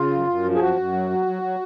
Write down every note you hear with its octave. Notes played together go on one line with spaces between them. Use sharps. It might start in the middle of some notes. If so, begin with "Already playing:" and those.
Already playing: C#3 F4
F#2
F#2
F3
G#4
F#2 F#4
F#2
F#3
F#3
F#3
F#3